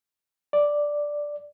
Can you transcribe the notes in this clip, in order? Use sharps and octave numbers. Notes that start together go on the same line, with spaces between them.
D5